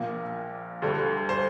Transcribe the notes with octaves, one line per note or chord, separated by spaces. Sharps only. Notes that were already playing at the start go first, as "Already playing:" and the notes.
Already playing: A#1 A#2 A#3
D2 D3 G3
C5